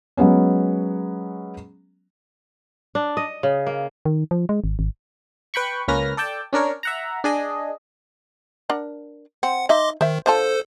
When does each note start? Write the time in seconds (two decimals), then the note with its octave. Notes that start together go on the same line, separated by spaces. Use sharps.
0.17 F#3 G#3 B3 C#4
2.95 D4
3.17 D#5
3.43 C#3
3.67 A#3
4.05 D#3
4.31 F3
4.49 G#3
4.64 G#1
4.79 G#1
5.54 B4 G5 B5 C#6
5.88 C#2 A#3 C#4 B4 F6 A#6
6.17 A4 D5 G5 A5
6.53 C#4 D4 A#4 C#5
6.83 E5 F#5 A#5
7.24 D4 G#4 D#5
8.69 D4 A#4 F#5
9.43 C4 F#5
9.69 D#4 D#5 E5 C6 D6
10.01 D#3 C5 E5
10.26 D3 F4 A4 C5 A5